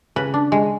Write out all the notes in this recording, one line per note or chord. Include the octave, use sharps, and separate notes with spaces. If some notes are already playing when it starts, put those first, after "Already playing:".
C#3 B4
D4
G#3